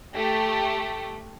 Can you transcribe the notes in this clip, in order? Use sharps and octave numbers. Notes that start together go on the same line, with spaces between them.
A3 G4